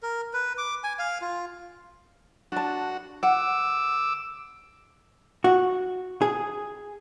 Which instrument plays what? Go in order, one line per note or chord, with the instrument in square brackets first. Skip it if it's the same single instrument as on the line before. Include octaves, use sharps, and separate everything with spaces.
[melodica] A#4
B4
D6
G#5
F5
F4
[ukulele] D4 A5 [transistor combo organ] F#4
[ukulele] F#5 [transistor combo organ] D6 E6
[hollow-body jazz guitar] F#4
G#4